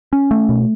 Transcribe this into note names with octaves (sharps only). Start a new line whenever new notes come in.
C#4
A3
B2